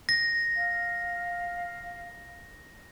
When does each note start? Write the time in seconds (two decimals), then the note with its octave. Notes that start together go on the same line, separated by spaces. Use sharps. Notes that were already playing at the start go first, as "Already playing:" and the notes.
0.09 A#6
0.56 F5